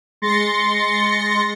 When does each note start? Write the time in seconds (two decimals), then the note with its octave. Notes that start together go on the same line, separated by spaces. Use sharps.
0.22 G#3 C6 A6 A#6 C#7